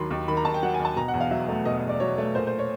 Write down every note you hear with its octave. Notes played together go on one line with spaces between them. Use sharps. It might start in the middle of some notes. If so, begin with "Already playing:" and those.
Already playing: D#2 D#3 F#3 B5 C6
D#2
D#3 B5
A#5
D#2 A5
G5
F#3 F#5
G#5
D#2
A5
B2 A#5
F#5
E2
F5
F#3 E5
A3
B2 D#5
D#5
E2
D5
F#3 C#5
A3
A#2 C5
C5
C#5